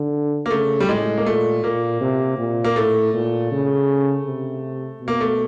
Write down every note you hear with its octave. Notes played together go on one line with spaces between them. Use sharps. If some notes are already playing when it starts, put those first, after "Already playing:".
Already playing: D3
A#3
C#3 A3
G3
A2 G#3
A#3
A#2 A3
A#2 A#3
C3
A#2
A#3
A2 A3
A#2
C#3
C3
B2
A#3
A3